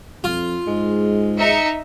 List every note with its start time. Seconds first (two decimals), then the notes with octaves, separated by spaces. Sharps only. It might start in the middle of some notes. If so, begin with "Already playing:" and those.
0.24 F2 F4
0.67 G#2 G#3
1.38 D#4 E5 C#7